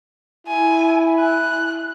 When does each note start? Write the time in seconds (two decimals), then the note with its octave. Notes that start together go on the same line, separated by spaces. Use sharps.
0.47 E4 G#5
1.20 F#6